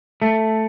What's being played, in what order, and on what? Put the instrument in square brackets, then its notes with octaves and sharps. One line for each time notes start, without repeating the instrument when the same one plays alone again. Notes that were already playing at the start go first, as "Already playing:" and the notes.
[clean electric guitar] A3